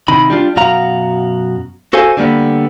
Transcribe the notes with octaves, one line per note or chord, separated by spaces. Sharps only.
C3 D#3 B5
G3 D4 F4
F#2 B2 F#4 F5 A#5
F#4 A4 C5 F5 G#5
D3 G3 A#3 B3